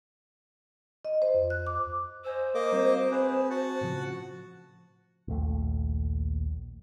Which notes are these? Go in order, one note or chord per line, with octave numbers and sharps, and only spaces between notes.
D#5
C5
F2
F#6
D6
C5 D#5 G#5 E6
A#3 A#4 D#5 D6
G3 C4 F#4
C4 G#4 B4
F#4 F#5 A5
A2 C#3 F3
A#1 D#2 A3